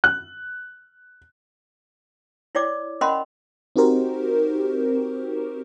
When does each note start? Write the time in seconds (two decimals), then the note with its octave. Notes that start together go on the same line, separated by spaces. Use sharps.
0.04 F#6
2.55 E4 C#5 D5 D6
3.01 C#4 A#4 D#5 F#5 B5 C6
3.76 C4 D#4 F#4 G4 A#4 C5